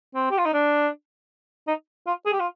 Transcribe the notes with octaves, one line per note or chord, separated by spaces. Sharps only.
C4
G4
F4
D#4
D4
D#4
F4
G#4
G4
F4